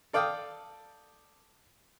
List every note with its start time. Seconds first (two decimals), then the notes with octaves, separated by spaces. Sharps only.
0.13 A4 D5 F5 G5 D#6